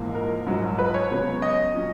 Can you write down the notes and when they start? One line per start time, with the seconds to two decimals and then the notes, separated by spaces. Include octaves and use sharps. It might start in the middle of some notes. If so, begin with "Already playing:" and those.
Already playing: A#1 G#2 E3 A#3
0.15 A#4
0.46 A#1 G#2 F#3
0.78 B4
0.94 C#5
1.10 C#2 C#3 F#3 B3
1.42 D#5
1.74 A#2 F#3 C#4